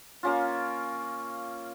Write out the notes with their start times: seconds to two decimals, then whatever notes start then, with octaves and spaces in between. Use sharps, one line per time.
0.23 A#3 C#4 F4